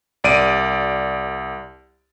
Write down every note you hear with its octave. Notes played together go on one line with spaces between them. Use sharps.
C2 D5 D7 D#7